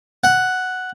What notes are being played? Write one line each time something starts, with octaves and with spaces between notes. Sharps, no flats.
F#5